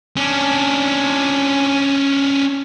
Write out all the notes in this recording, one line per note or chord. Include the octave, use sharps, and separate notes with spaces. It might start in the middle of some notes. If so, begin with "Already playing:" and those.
C#4 D4